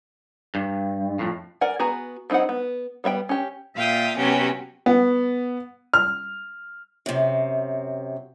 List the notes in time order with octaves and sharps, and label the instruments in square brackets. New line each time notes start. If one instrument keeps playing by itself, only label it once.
[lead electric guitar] G2
F2 A2
[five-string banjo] A#4 D5 F#5 G#5
B3 F#4 G#4 G#5 A#5
F3 C4 D#4 E4 F#5
B3
G3 B3 E5 G5
C#4 G4
[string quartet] A#2 E5 F5 G5 D#6
C3 F#3 B3 C#4 G4
[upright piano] B3
F6
[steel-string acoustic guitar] F#2 C3